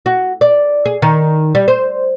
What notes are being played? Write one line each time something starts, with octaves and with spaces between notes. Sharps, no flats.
F#4
D5
G#4
D#3
G3
C5